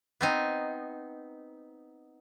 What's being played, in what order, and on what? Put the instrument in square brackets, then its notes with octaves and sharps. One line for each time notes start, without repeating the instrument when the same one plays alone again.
[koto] B3 C4 D#4